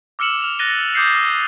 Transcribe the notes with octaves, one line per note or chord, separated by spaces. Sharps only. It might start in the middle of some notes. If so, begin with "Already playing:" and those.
D6 E6 F6 C#7 E7 F#7
F6 F7
F#6 A6 A#6 D#7 G7
D6 D#6 G6 A6 C7 C#7
E6